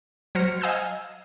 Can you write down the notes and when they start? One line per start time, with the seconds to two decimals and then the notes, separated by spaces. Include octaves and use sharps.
0.35 F#3 C5 F6 A#6 C#7
0.61 D#5 F5 G#5 D#6 E6 G6